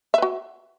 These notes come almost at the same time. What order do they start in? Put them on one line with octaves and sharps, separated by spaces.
E5 B4 F#4